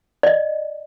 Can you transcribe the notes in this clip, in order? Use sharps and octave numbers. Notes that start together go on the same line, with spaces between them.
D5 D#5